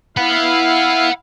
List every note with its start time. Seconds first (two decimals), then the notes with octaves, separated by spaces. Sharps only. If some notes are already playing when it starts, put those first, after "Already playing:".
0.17 E4 F5 F#5 B5